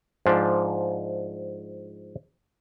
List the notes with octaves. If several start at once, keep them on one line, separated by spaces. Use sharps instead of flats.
G#2 F3 D4